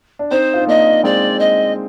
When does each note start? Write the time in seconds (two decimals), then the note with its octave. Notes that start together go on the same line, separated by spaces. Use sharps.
0.19 D4
0.31 C4 D#4 C5
0.54 F4
0.60 D#4
0.67 A#3 D4 D#5
1.04 G#3 C4 D5
1.39 D#5